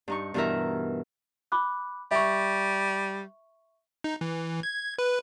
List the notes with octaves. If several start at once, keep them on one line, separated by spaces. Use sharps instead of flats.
G2 D#4 C#6
G2 B2 E3 E4 A#4 E5
B5 D6 F#6
G3 E5 C#6
D#4
E3
G#6
B4